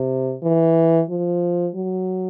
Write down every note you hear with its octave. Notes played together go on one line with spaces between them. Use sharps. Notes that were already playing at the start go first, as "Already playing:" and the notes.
Already playing: C3
E3
F3
F#3